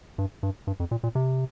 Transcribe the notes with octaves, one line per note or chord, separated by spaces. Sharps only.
G2
G2
G2
F2
A#2
A#2
C3